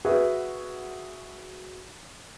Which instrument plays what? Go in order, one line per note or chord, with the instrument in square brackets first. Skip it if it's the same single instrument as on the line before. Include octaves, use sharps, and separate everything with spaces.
[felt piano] F#4 G#4 B4 E5